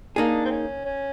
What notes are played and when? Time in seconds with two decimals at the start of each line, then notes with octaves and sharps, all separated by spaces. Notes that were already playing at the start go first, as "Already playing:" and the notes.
0.16 A#3 D4 D#4 G#4
0.45 C4
0.51 C#4
0.85 C#4